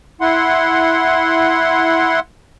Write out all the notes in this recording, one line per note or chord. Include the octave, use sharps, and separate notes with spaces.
E4 F#5 C6